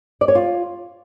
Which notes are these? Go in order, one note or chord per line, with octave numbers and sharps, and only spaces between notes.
D5
C#5
F4